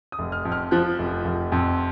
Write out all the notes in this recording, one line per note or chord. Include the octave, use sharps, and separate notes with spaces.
D#6
F1
F6
F2
F6
F3 F#6
F1
F1
F2